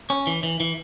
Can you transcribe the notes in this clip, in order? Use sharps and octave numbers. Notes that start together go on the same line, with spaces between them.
C#4
E3
E3
E3